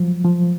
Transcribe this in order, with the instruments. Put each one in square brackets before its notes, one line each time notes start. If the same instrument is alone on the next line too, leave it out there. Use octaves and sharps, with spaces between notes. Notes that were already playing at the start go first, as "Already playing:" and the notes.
Already playing: [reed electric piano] F3 F#3
F3